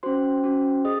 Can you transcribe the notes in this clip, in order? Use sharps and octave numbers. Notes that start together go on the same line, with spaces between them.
C#4 F#4 C5 C6
C#4 F#4
G#4 D#5 D#6